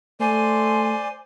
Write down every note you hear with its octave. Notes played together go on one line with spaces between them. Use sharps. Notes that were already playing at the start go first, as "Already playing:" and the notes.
A3 C5 D5 G#5 C6